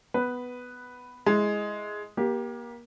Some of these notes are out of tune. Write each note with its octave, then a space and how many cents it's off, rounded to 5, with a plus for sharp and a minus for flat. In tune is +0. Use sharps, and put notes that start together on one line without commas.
B3 +10 B4 +0
G#3 +5 E4 +0
A#3 +25 G4 +0